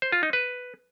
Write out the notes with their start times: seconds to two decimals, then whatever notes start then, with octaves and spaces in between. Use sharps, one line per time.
0.02 C5
0.12 F4
0.23 D#4
0.33 B4